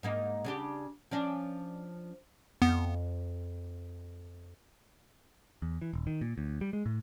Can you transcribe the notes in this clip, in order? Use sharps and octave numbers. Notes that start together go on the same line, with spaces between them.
G#2 A#3 D#4
C#3 D4 G4
F3 C#4 D4
F2 B3
E2
E3
D#1
D#3
A#2
D2
G3
G#3
A2